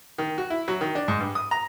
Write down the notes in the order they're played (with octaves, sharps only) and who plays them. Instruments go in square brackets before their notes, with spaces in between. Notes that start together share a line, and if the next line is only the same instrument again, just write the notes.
[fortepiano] D#3
F#4
E4
F#3
D#3
D4
G#2
G2
D#6
A#5